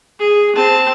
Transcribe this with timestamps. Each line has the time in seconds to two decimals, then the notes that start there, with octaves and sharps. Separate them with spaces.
0.19 G#4
0.56 C4 A5